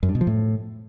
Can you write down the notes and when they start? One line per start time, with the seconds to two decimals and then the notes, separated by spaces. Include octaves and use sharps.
0.03 F#2
0.09 G2
0.15 B2
0.21 F3
0.27 A2